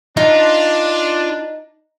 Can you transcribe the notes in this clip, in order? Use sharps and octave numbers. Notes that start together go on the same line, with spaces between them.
D4 D#4 F4